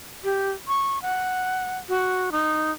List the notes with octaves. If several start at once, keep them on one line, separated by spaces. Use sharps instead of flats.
G4
C#6
F#5
F#4
D#4